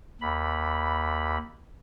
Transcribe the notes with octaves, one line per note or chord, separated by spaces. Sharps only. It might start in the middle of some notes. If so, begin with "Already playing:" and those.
D#2 B5